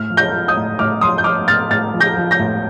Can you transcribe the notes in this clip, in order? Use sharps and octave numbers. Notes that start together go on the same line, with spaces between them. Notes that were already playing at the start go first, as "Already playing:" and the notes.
Already playing: A2 F6
F3
G6 A#6
F3
D#6 G6
A2
A2 D6 F6
F3 C6 D#6
G6
F3 D6 F6
A2 F6 A6
A2 F6 A6
F3
G6 A#6
F3
G6 A#6
A2